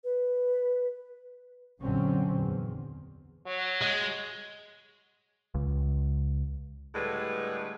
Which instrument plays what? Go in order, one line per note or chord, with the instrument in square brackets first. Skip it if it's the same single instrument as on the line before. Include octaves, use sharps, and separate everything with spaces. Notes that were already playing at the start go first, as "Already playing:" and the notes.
[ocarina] B4
[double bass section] A#1 F#2 D3 F#3 C4 C#4
E2
[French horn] F#3
[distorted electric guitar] G#3
[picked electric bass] C#2
[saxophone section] A2 D3 G3 G#3 B4